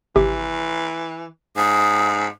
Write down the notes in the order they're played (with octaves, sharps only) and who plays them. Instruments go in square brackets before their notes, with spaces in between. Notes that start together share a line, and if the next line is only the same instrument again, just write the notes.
[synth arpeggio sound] G#1 C3 G4 [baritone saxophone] E3
[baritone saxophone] G#2 [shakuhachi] D#6